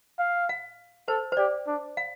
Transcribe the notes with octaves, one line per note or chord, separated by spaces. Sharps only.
F5
F5
A4 C5
C5
G4 D5
D4
F5